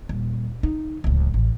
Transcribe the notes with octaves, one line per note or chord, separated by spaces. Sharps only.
D#1
D#4
D1 C#2
A1